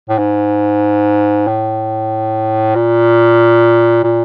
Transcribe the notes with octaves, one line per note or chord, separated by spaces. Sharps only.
A2
G#2
A2
A#2
A#2